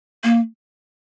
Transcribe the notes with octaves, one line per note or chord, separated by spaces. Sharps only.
A#3